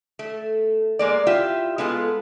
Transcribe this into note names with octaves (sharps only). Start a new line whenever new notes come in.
A3
G#3 A#3 D5
E4 F4 G4 E5
G#3 B3 F4 A4